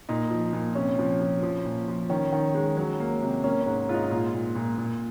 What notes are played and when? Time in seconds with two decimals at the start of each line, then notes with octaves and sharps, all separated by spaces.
0.09 A#2 D#4
0.30 F3
0.53 A#2
0.75 C3 C#4
0.99 F3
1.21 F3
1.43 F3
1.65 A#2
1.88 F3
2.10 D#3 C#4
2.32 D#3
2.55 G#3
2.77 F#3
3.00 A#3
3.22 C3
3.44 A#3 C#4
3.61 C#4
3.66 G#2
3.89 G#2 F4
3.94 D#4
4.11 A#2 F4
4.34 A#2
4.55 A#2
4.78 A#2